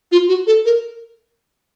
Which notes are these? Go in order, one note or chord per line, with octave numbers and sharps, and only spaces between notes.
F4
F#4
A4
A#4